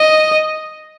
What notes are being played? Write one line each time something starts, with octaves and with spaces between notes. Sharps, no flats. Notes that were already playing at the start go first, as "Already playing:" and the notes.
Already playing: D#5